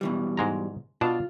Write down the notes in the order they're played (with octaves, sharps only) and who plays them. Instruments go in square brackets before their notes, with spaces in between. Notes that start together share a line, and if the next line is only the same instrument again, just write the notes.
[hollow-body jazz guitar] B2 E3 G3
[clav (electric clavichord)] G#2 G#3 A#5
[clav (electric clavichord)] B2 D4 A5 [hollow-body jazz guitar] F4